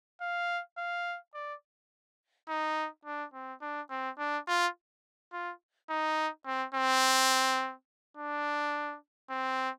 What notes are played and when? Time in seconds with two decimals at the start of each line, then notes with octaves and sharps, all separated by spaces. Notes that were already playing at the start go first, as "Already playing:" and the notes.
0.21 F5
0.78 F5
1.34 D5
2.49 D#4
3.05 D4
3.34 C4
3.61 D4
3.90 C4
4.19 D4
4.48 F4
5.32 F4
5.89 D#4
6.46 C4
6.74 C4
8.17 D4
9.30 C4